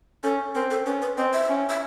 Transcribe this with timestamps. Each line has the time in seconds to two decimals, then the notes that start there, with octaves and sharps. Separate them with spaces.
0.23 C#4 A4
0.55 C4 A#4
0.71 A4
0.86 C#4 B4
1.02 B4
1.18 C4 D#5
1.33 E5
1.50 C#4
1.70 E5